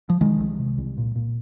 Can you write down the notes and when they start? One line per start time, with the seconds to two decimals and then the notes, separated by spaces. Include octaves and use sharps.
0.10 F3
0.21 C2 D#3 G#3
0.40 C2
0.59 C3
0.78 C2
0.97 A#2
1.16 A#2